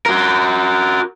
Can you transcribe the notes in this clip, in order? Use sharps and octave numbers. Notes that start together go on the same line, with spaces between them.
F#4 A#4